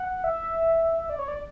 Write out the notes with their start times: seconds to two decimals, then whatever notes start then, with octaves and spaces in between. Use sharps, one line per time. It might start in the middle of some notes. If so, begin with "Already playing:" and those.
Already playing: F#5
0.24 E5
1.10 D5
1.19 C#5
1.28 D5